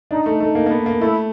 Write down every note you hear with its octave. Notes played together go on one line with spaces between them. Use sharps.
D4 D#4
A3
A3
A#3
A#3
B3
A#3
A3 E4